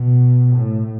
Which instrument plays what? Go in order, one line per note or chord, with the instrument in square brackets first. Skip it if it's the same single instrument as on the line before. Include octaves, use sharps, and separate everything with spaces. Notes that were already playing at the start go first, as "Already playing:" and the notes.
Already playing: [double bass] B2
A2